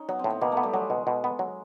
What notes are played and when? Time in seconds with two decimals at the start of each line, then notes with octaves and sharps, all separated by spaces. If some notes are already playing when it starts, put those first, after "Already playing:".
Already playing: C#4 D#4
0.09 F#3 B3
0.19 C4
0.24 A2
0.30 B3
0.41 B2 A#3
0.52 A3
0.57 B3
0.63 G3
0.74 F#3 G#3
0.90 B2
1.07 B2
1.24 B3
1.39 F#3